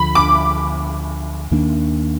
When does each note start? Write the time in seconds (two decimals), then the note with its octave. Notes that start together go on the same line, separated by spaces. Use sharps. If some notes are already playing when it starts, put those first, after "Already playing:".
Already playing: D2 D3 F3 B5
0.15 D6
1.51 D#2 D#3 A#3 D4